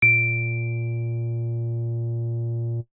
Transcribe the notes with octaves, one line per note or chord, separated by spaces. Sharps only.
A#2 D7